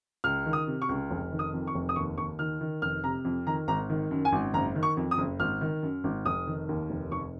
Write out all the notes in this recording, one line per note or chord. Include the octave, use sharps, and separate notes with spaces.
C#2 F6
D#3
D#6
C3
C#6
C#2
F1
D#3
D#6
F2
C#6
F1
D#6
D#2 C#6
D#2 C#6
D#3 F6
D#3
F1 F6
C3 A#5
F2
D#3 A#5
G#1 A#5
D#3
F#2
G#5
G#1
F#1 A#5
D#3
C#6
F2
D#6
F#1
G#1 F6
D#3
F#2
G#1
F1 D#6
D#3
D#2
F1
F1 C#6